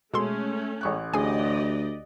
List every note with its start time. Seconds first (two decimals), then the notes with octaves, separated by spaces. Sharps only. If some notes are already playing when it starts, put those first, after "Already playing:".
0.14 B2 G#3 A3 C#4 A4 C6
0.81 A1 C#6 F#6
1.14 D2 G4 G#4 D5 D#5 G#5